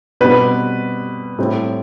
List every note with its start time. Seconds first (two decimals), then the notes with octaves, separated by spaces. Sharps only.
0.21 B2 G3 C4 B4
1.38 A2 G3 C4